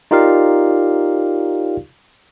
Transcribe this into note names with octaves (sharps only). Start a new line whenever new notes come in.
D#4 F4 G4 A#4 D5 F5